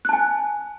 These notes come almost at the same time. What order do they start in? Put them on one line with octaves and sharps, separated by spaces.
F#6 A5 G#5